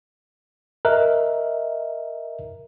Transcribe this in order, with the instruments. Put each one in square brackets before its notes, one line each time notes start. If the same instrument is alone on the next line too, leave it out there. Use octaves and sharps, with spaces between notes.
[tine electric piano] A#4 D#5 E5 F#6